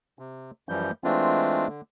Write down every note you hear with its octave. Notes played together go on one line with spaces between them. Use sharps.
C3
F#2 E3 F3 G3 G6
E3 G#3 A3 C4 D4 F4
D3